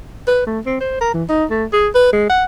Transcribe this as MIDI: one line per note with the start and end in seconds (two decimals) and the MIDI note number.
0.28 0.43 71
0.47 0.60 57
0.66 0.78 60
0.81 0.99 72
1.01 1.13 70
1.14 1.24 52
1.29 1.45 63
1.51 1.65 57
1.73 1.89 68
1.95 2.11 71
2.13 2.26 56
2.30 2.45 78